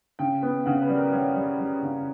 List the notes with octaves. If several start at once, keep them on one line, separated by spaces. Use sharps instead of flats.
C#3 G5
B3
C#3 F#5
B4
G3
A#4
G3 C#5
G3
G3
C#3